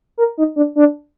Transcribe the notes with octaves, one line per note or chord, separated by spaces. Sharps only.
A#4
D#4
D4
D4